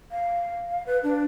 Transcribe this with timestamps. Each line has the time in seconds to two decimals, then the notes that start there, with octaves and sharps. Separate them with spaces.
0.11 F5
0.69 F5
0.86 B4
1.03 D4